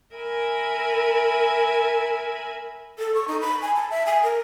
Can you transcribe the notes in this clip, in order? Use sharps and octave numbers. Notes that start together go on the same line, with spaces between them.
A#4 E5 G#5 B5
A4
C#6
D#4
B5
G#5
A5
E5
G#5
A#4